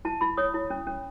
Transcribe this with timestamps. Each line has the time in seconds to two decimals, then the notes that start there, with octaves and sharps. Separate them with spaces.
0.05 E4 A5
0.21 E4 B5
0.37 C#5 D#6
0.54 E4
0.70 C#4
0.87 C#4